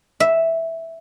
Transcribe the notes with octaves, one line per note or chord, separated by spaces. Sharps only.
E5